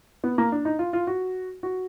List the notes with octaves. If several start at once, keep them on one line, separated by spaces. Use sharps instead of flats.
B3
A#3
D4
D#4
F4
F4
F#4
F#4